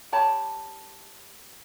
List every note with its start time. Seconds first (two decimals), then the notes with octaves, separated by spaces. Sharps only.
0.12 G4 C#5 A5 B5